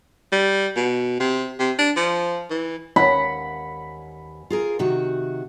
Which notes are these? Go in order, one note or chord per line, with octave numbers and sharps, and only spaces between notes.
G3
B2
C3
C3
D4
F3
E3
D#2 F#5 B5
F4 G#4 A#4
C3 D#3 F#4